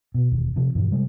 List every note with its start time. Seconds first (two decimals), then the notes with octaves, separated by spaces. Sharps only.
0.14 B2
0.31 E1 D#2
0.56 C3 F3
0.75 G2 A#2 E3 F3
0.91 C3 G3 G#3